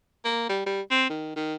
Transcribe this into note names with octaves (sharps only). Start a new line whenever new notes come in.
A#3
G3
G3
C4
D#3
D#3